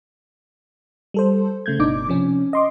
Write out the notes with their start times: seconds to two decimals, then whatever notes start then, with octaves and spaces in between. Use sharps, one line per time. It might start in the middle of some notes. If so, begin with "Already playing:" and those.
1.14 G3 A4 C5
1.66 C#3 A3 G6 G#6
1.79 G1 B2 D4 D#4 D6
2.09 C3 F3 C#4
2.53 D#5 C6 D6